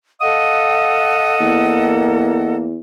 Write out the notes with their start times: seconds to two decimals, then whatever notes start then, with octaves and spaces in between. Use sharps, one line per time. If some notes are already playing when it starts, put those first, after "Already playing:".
0.21 A4 D#5 F5 F#5 D#6
1.41 E2 A#3